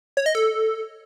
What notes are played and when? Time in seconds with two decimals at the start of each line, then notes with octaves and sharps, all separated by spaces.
0.17 C#5
0.26 D#5
0.35 A4